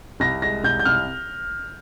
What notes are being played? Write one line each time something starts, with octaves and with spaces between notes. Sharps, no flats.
C2 A#6
G#3 A#6
C2 G6
G6
C2 F6